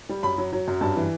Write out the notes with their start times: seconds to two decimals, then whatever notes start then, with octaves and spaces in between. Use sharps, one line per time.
0.09 G3
0.23 F#2 B5
0.38 F#3
0.53 F#3
0.68 F#2
0.81 G2 A5
0.96 E3